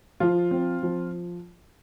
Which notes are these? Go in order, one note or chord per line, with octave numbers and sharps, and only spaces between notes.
F3 F4
C4
F3